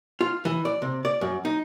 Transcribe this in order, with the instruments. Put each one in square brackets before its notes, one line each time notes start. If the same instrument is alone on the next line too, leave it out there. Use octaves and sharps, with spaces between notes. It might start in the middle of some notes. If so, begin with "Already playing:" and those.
[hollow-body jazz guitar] F4
E3
D5
C3
D5
F#2
D#4